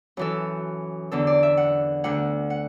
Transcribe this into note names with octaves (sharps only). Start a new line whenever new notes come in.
F#2 E3 A4
E2 D3 A4
D5
E5
F#5
D2 D3 F#5
F#5